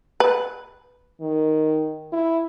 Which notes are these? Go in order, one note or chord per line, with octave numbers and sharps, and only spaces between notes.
B4
D#3
E4